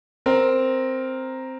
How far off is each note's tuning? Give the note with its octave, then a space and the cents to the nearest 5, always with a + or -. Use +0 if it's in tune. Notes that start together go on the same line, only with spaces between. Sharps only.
C4 +0 A#4 +0